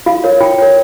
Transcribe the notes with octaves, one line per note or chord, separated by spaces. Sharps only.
F4 F5
A#4 C#5
F4 G5
A#4 C#5